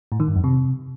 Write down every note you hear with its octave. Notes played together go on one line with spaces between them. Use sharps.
A2
D#3
G2
F2
C3